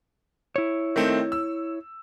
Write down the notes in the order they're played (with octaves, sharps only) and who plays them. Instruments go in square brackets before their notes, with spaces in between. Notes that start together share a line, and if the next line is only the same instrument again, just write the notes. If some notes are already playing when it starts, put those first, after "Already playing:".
[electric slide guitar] E4 C#5
[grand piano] D#3 A3 C4
E6